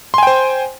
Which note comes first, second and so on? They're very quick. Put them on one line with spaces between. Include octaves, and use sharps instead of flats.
C6 G#5 G5 C5